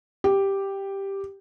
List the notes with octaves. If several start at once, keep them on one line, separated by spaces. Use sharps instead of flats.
G4